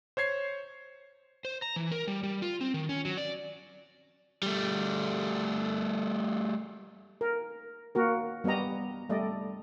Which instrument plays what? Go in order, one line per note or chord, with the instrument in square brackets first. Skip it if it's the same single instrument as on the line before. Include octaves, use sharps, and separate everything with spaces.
[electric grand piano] C5 C#5 G#6 C7
[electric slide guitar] C5
A#5
E3
A#4
G3
G3
F4
C4
D#3
C#4
F#3
D5
[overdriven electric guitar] G3 A3
[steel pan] A#4
A#3 F#4 A#4
G3 B3 G4 D#5 A#5
G3 A3 D5 D#5